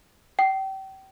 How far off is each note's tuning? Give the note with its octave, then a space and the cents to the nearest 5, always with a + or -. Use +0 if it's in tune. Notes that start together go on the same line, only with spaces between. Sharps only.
G5 -30